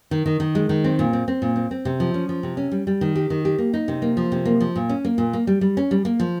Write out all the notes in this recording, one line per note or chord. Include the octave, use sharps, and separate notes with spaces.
D#3
D#3
D#3
G#3
D#3
C4
A#2
C4
C4
A#2
C4
C4
C3
F3
C#4
F3
C3
C#4
G3
G3
D#3
G4
D#3
G4
A#3
D#4
C3
A#3
F3
C3
A#3
F3
A#2
C#4
A#3
A#2
A#3
G3
G3
C#4
G3
A#3
F3